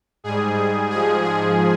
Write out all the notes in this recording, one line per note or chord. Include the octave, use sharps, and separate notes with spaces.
G#2 G3 G#4
G#2 F3 G#4
G#4